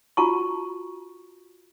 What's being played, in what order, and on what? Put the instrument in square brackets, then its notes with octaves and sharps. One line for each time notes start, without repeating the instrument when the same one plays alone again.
[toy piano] F4 F#4 A5 C#6